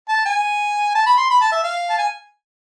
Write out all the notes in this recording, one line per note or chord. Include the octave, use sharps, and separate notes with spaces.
A5
G#5
A5
B5
C6
B5
A5
E5
F5
A5
G#5